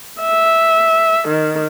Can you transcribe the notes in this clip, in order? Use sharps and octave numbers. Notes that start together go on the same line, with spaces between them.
E5
D#3